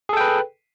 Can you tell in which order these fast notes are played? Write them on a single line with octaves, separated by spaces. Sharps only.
G#4 A4 G5 B4